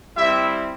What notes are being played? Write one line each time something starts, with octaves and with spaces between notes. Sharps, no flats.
G3 C4 E4 G4 E5